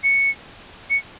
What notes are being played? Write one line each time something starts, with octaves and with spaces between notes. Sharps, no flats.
C#7
C#7